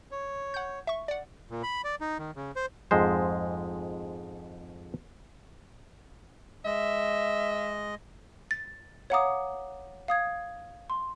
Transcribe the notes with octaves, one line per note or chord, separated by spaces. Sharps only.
C#5
F#5 G6
E5 C#6
D5 F#5
A#2
B5
D5
D#4
D#3
C#3
C5
F2 G#2 G#3 C5
G#3 D#5 E5
A6
C#5 F5 F#5 A#5 D6 D#6
F5 D#6 G#6
C6